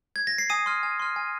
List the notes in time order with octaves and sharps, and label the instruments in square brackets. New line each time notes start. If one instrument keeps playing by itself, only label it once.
[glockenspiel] G#6
A#6
C7
G#5 D#6 D#7
C6 F6
G#5
C6 F6
G#5